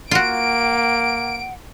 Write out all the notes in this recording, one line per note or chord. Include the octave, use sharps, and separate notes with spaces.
A#3 F4 F#4 F#5 D7